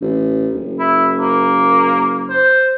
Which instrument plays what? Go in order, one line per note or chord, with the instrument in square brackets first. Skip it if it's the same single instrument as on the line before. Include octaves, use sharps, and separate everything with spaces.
[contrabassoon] A1
F#1
[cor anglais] E4
A#3
C5